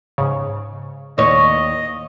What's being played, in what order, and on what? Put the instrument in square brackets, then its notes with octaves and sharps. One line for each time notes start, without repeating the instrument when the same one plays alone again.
[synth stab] G#2 C#3
[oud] D#2 C#5 [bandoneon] D#5